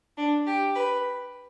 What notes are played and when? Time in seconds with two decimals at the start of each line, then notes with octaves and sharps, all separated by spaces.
0.17 D4
0.46 G4
0.75 B4